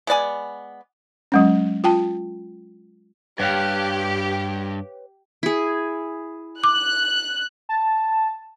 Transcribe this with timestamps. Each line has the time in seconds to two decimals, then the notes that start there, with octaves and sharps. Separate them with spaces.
0.07 G#3 B3 D5 G#5
1.32 F#3 G#3 C#4
1.84 F4 G5 A5
3.40 G2 G4 B4 C#5 F5
5.43 E4 G#4
6.64 D6 F#6
7.69 A5